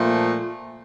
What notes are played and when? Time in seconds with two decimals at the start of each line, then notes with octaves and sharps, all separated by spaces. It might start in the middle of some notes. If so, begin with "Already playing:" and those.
Already playing: A#2 F3 A3